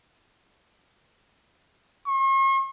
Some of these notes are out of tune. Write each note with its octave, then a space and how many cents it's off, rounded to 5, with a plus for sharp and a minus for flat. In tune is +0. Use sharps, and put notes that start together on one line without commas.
C#6 -45